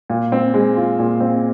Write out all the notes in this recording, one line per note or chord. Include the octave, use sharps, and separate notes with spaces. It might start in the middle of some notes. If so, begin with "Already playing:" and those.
A#2
C4
G#3
F4
A#2
C4